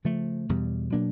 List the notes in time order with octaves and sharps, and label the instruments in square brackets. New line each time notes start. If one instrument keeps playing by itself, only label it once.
[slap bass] C#3 F3 A3
E2 B2 G3
B2 F#3 A#3 D4